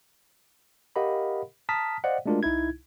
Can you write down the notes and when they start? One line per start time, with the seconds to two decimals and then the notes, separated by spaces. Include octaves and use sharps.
0.96 G4 A#4 D#5 F5 F#5 B5
1.69 A5 A#5 D#6 F6 B6
2.04 C5 D5 D#5 F5 F#5
2.26 G#3 A3 D4 F4 F#4 A#4
2.43 C2 D#4 E4 G#6